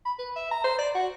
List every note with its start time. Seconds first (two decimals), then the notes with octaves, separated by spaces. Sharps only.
0.06 B5
0.19 B4
0.36 E5
0.51 A#5
0.64 C5
0.79 D5
0.95 F#4